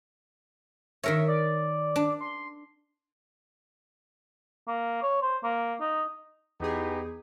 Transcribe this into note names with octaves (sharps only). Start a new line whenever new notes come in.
D#3 A#4 C#5 E5
D5
D4
C6
A#3
C#5
C5
A#3
D#4
E2 B3 D#4 G4 G#4